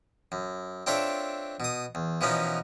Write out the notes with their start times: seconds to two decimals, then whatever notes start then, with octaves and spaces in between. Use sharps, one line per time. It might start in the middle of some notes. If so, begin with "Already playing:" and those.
0.32 F#2
0.87 C4 D4 F4 A4 C#5 E5
1.60 B2 D#6
1.95 E2
2.21 B2 E3 F3 B3 C#4 D#4